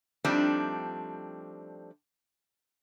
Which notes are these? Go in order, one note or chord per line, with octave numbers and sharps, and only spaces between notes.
F3 G3 A3 C4 D4 D#4